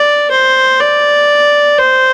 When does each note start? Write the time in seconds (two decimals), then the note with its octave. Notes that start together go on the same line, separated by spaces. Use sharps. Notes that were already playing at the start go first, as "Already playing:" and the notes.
Already playing: D5
0.31 C5
0.80 D5
1.78 C5